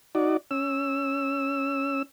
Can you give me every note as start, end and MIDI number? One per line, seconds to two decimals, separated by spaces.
0.15 0.37 63
0.15 0.37 66
0.15 0.37 74
0.51 2.02 61
0.51 2.02 88